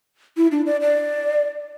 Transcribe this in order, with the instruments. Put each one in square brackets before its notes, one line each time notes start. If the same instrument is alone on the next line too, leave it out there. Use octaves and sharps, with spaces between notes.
[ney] E4
D4
D5
D5